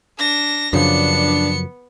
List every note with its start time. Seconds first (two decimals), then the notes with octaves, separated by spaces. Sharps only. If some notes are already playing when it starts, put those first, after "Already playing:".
0.18 D4 A#6
0.73 F#2 C#3 F3 B3 D4 C#7